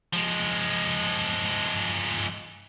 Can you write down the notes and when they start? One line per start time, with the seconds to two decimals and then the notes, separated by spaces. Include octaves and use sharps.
0.13 F3 G#3